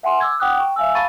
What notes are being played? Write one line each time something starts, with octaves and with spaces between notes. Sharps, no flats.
E5 F#5 G#5 C6
D6 E6 G#6
F#5 G5 D6 D#6 F#6
G5 C#6
E5 F5 G#5 E6
F5 A5 B5 C#6 A6 D#7